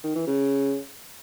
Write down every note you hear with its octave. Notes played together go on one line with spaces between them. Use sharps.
D#3
E3
C#3